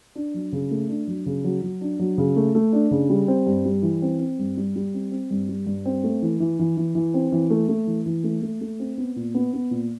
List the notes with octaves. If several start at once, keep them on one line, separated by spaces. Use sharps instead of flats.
D4
F#3
C#3
A3
D4
F#3
C#3
F#3
F#3
D4
F#3
C#3
A3
A3
D4
C#3
G3
C4
G2
G3
E3
C4
C4
G2
G3
G3
C4
C4
G2
G3
G2
C4
A3
E3
E3
E3
E3
E3
C4
E3
A3
A3
E3
E3
A3
A3
A3
C4
B3
A#2
B3
B3
A#2